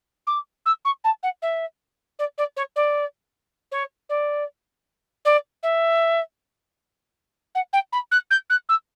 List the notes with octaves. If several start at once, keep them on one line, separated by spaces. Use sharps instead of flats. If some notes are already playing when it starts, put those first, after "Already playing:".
D6
E6
C#6
A5
F#5
E5
D5
D5
C#5
D5
C#5
D5
D5
E5
F#5
G5
B5
F#6
G6
F#6
E6